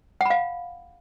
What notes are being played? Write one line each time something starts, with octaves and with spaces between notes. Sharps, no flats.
F5 F#5 B5